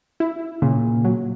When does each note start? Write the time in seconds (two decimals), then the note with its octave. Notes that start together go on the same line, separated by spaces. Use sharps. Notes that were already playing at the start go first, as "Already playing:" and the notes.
0.20 E4
0.62 A#2 C#3
1.05 F#3